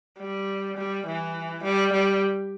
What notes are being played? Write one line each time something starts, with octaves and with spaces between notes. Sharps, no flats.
G3
G3
E3
G3
G3